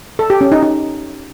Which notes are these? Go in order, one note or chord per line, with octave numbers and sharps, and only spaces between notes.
A4
G4
C#4
D#4
D#4